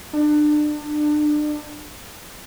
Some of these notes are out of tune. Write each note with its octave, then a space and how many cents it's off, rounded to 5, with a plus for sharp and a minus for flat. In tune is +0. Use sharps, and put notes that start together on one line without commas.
D4 +30